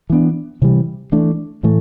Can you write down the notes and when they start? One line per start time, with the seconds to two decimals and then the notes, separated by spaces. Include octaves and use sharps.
0.10 E3 B3 D4
0.62 C3 E3 G3
1.12 E3 A3 D4
1.63 A2 E3 A3